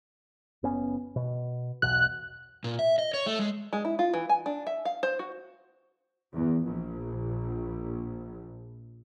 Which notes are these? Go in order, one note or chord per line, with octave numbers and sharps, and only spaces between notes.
F#1 B3 C#4
B2
B1 E2 B2 F#6
A#2
E5
D#5
C#5
A3
G#3
G#3
E4
F4
E3
G#5
D4
E5
F5
C5
F#4
E2
A#1